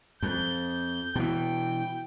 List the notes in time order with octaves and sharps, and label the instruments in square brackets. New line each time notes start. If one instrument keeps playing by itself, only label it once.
[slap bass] F2 [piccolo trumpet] G6
[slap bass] B2 E3 [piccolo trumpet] G5